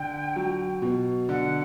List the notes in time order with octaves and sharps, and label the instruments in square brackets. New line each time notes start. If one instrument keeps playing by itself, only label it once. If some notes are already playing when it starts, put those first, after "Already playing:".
Already playing: [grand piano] D3 [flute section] G5
[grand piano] F#3
B2
[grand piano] D3 [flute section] F#5